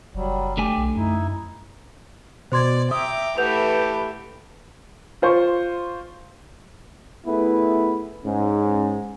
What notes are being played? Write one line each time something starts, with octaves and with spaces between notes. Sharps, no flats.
F#1 F#3 G3
D3 A3 G4 G#5
B1
F#2 D#4 E4
B2 C5 D5 C6 G#6
E5 G5 A#5 D6 D#6
E3 A3 G4 B4 F#5 G6 F7
F4 C5 C#6
A3 B3 E4 G#4 B4
G#2 C#4